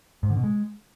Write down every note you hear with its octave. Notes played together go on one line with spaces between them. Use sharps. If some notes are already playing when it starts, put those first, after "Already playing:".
G#2
D3
B2
G#3